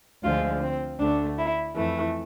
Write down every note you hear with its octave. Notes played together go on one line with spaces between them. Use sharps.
D2 D3 F3 G#3 F4
C4
D2 D3 A3 D4
E4
F2 E3 A3